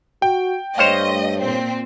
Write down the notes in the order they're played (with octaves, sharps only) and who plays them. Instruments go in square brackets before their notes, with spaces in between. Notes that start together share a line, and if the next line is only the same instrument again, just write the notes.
[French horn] F#4 [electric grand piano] G5
[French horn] G2 [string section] A3 D#5 [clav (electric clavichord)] C5 C#5 F5
[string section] A#2 C4